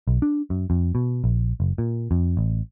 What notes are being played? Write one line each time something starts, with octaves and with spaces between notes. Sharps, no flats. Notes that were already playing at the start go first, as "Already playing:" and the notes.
B1
D4
F#2
F2
B2
A#1
F#1
A#2
F2
A1